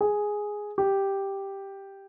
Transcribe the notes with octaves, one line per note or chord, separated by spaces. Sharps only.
G#4
G4